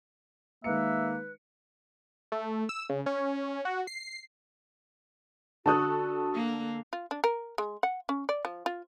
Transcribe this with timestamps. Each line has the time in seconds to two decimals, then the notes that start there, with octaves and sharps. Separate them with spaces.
0.64 D#3 G#3 A#3 B4 E5 C#7
2.32 A3
2.69 E6
2.89 C#3
3.06 C#4
3.65 F#4
3.87 C7
5.66 D3 F#4 A4 A5 C#6 D#6 F#6
6.34 A#3
6.93 F4
7.11 D4
7.24 A#4
7.58 G#3
7.83 F#5
8.09 C#4
8.29 D5
8.45 F3
8.66 F4